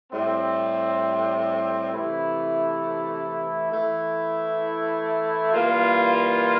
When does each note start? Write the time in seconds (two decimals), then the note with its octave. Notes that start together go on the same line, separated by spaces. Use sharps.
0.12 A2 G3 C4
1.92 C3 E3 A3 E4
3.72 E3 A3 E4
5.51 E3 G3 A#3 F4